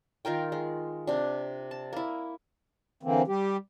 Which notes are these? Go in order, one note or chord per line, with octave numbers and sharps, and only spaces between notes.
D#3 F4 A#4 G5
G#3
C3 D4
A5
A#3 E4
D3 E3 A#3 C4
G3 G4